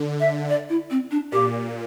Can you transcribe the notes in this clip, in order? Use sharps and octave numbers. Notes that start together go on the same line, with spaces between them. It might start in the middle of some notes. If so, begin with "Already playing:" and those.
Already playing: D3
E5
D5
E4
C4
D4
A#2 G4